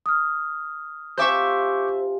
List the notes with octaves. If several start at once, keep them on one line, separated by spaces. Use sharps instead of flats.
D#6 F6
C3 F4 C5 E5 G#5 C#6 D6 G6